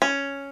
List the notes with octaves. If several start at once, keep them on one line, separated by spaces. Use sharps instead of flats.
C#4